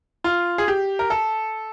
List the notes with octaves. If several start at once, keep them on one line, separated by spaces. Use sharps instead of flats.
F4
G#4
G4
A#4
A4